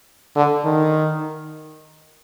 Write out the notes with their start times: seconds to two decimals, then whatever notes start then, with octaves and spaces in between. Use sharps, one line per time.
0.36 D3
0.65 D#3